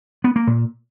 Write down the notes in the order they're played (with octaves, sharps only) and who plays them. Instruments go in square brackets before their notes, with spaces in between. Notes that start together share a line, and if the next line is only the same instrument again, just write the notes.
[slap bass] B3
A#3
A#2